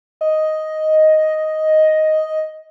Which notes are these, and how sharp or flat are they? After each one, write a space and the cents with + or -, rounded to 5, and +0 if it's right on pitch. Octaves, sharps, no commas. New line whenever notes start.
D#5 +5